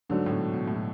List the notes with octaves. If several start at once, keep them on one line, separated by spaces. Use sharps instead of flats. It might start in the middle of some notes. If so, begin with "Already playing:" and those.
G#2 D3 F#3 A3 D4 F#4
A2
B2
B2
A2
B2